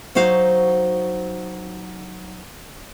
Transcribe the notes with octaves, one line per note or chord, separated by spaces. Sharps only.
F#3 D#4 F#4 C5 F5